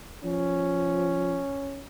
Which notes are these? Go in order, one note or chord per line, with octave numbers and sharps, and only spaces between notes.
F3 C#4